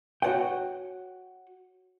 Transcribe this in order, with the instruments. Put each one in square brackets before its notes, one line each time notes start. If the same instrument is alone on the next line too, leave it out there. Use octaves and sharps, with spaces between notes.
[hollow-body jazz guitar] F#4 C#5 D5 F#5 G5